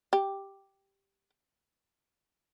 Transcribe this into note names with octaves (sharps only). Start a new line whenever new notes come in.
G4